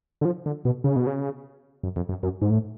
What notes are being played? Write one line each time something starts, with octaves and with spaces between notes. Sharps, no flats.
D3
F3
D3
B2
C#3
B2
C#3
F#2
F2
F#2
F#2
G#2
A2